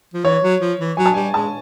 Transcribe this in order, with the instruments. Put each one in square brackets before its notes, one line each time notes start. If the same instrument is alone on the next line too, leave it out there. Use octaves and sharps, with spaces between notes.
[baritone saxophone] F3
[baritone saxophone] E3 [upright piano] C#5
[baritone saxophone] F#3
F3
E3
[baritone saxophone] F#3 [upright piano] G#5
[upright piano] A5
[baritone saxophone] G3 [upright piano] G#5
[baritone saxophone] G#3 [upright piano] A5